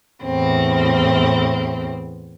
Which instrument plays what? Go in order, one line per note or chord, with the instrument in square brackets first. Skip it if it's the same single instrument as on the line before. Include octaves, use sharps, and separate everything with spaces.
[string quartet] E2 A2 C4